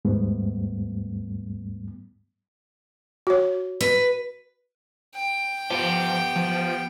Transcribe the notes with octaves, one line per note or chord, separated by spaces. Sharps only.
D#2 G#2 G3 A3 B3
F#4 C#5
B4
G5
F3 B3 G4
F3